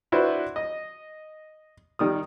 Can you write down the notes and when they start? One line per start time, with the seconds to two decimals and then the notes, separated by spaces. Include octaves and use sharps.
0.12 D4 E4 F#4 B4 C5
0.56 D#5
1.99 D#3 G3 D#6